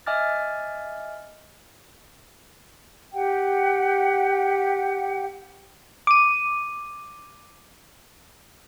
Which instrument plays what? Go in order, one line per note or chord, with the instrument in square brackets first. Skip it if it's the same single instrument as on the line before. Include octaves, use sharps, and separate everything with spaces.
[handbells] D#5 E5 G#5 D6 F6 A6
[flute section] G4 F#5 G5
[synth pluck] D6 D#7